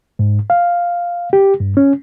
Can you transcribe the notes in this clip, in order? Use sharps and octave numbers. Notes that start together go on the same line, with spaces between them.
G#2
F5
G4
G2
C#4